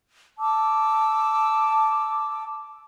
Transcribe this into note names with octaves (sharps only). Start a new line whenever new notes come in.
A5 D6 E6